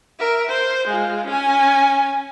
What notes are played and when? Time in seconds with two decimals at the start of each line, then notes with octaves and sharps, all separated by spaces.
0.19 A#4 E5
0.49 C5
0.87 G#3 F4
1.26 C#4 G#5